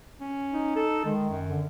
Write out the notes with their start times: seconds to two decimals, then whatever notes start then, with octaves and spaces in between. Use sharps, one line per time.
0.21 C#4
0.53 D#4
0.76 A4
1.05 D#3 G#3
1.29 F#2
1.49 D3